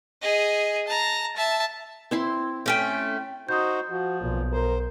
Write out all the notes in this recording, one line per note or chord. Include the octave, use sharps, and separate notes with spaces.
G#4 D#5
A5 A#5
E5 A5
C4 E4 C6
A3 C#4 G5
D#4 F#4 C5 D#6 G6
F3 F#4
B1 A#2
A#4 C5